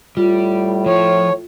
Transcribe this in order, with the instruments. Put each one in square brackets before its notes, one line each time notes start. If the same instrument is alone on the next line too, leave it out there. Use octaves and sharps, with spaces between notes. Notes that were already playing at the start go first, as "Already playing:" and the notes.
[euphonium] A2 [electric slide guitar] G3 [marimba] F4
[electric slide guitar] F3 [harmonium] C#5